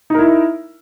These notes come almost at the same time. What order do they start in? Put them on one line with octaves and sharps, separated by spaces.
D#4 A#4 E4